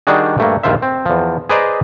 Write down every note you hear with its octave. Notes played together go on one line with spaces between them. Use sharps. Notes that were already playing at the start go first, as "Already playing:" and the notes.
D#3 G3 D4 F#4 G#4
G2 A3 A#3
A#1 D#2 F4 C5 E5
C4
E2 F3
G#4 B4 C5 D5 D#5 A#5